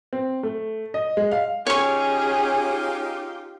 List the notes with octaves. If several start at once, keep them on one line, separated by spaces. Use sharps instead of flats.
C4
A3
D#5
G#3
F5
C#4 D#4 F4 G4 G#4 C#5 G#5 C#6